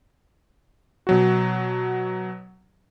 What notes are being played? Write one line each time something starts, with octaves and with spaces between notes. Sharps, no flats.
B2 F#3 F#4